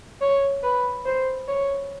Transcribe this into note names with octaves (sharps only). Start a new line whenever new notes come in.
C#5
B4
C5
C#5